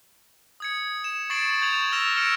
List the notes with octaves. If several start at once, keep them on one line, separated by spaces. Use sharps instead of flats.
D#6 G#6 C#7
E7
C#6 A6 C7 D7 F#7
C#6 G6 G#6 F7 F#7
E6 F6 A6 A#6 E7 F7
E6 F6 C#7 D7